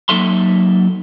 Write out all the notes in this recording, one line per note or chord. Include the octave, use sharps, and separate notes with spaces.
F#3 A#3 D#4 A4 E5 C6